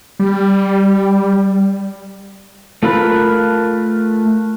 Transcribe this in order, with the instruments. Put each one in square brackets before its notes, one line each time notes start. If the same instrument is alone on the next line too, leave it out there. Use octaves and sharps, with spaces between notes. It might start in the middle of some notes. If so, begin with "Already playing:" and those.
[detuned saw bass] G3
[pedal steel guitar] A3 F4 A#4 B4 B5